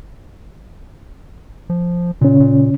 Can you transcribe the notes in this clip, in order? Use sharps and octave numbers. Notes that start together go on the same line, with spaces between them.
F3
A#2 C#3 C#4
A#2